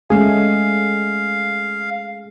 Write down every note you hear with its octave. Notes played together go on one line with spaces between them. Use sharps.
G#3 A3 C#4 G#4 F5